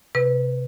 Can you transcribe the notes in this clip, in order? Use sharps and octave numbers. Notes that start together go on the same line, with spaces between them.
C3 B4